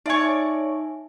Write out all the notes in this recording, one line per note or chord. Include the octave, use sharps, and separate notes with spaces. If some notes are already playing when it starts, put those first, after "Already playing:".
D#4 C#5 D5 E5 G#5